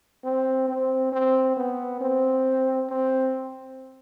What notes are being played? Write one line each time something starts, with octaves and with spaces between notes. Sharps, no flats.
C4
C4
C4
B3
C4
C4